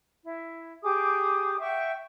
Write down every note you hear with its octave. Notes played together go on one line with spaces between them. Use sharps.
E4
G4 G#4 D6 D#6
E5 F#5 G5 C#6